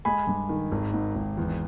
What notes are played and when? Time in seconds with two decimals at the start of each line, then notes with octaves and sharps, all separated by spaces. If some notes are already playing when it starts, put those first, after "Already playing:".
0.05 G#3 G#5 B5
0.27 G2
0.49 D#3
0.72 G#1
0.93 G#2
1.16 G#1
1.37 E2